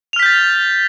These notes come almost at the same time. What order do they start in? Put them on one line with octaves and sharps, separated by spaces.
F7 F6 B6 G6 A6